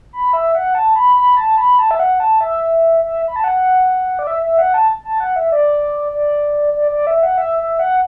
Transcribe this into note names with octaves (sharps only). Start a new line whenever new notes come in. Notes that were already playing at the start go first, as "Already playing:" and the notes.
B5
E5
F#5
A5
B5
B5
A5
B5
A5
E5
F#5
A5
E5
E5
B5
A5
F#5
D5
E5
E5
F#5
A5
A5
F#5
E5
D5
D5
D5
D5
E5
F#5
E5
E5
F#5